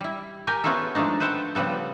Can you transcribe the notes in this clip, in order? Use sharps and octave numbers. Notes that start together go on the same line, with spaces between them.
G3 E4
G4 A#4 G5 G#5
B3 C#4 E4 F4 G#4 A4
F3 G#3 A3 D4 D#4
B4 C5 E5 F#5 G5 A5
C#3 F3 G3 B3 A4